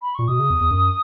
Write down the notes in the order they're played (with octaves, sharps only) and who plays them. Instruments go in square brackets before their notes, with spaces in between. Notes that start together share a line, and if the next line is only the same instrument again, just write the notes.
[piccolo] B5
[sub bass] A#2 [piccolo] C#6
[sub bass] B2 [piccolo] D#6
[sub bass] C#3
E2
E2
F#2